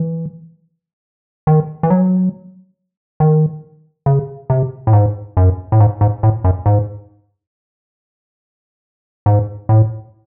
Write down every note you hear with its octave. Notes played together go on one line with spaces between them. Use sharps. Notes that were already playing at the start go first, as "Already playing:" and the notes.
Already playing: E3
D#3
E3
F#3
D#3
C#3
C3
A2
G#2
F#2
A2
G#2
G#2
A2
F#2
G#2
G#2
A2